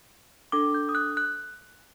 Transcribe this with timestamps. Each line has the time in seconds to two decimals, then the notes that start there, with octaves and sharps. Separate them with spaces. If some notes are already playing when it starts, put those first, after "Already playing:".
0.52 D4 A4 D6
0.74 G6
0.89 D#6
0.95 F#6
1.17 F#6